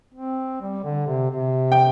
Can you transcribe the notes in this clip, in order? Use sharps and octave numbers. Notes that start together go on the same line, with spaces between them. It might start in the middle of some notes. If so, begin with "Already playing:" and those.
C4
G3
D3
C3
C3
G5